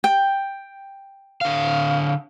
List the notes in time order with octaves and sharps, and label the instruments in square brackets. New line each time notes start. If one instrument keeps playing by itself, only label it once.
[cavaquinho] G5
[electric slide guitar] D3 F5